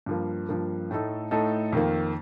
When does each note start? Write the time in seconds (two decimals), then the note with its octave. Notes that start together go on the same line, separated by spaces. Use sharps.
0.06 G2 F3 A#3
0.49 G2 F3 A#3
0.91 A2 A3 D#4 A4
1.31 A2 A3 D#4 A4
1.72 F2 D#3 A#3